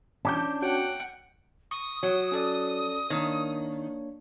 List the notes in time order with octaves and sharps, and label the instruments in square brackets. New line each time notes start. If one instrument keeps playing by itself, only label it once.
[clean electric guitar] C#4 D4 [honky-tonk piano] A5 D6 G6
[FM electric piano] F#4 C#5 [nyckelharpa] F#5 G5
[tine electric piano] C#6 [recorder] D#6
[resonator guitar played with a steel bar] F#3
[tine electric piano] C#4 A4 D5
[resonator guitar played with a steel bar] D#3 [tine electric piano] A#3 D4 C#5